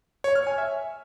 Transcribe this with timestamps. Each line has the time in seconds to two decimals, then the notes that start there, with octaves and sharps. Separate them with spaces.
0.24 C#5
0.35 F6
0.47 G#5
0.58 E5